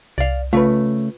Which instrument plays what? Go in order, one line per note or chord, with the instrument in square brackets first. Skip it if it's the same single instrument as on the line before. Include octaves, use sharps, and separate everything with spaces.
[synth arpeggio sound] C2 [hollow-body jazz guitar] D5 F5
[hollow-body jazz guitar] C#3 A3 [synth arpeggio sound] F4 B4